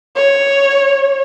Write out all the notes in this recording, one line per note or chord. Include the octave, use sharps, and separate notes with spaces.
C#5